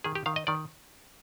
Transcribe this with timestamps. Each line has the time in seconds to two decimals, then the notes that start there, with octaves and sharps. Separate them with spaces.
0.04 D#3 G#4
0.15 G4
0.26 D#3 F5
0.36 D#5
0.47 D#3 D5